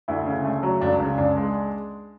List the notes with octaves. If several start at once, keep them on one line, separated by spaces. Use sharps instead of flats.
D2 E4
C#3
A3
F#3
C#2 D4
C#3
C#2 D4
G#3